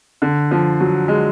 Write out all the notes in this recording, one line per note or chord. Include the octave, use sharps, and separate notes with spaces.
D3
F3
F#3
G#3